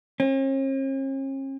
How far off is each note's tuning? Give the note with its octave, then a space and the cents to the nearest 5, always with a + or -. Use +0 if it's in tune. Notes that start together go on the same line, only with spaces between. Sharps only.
C#4 -45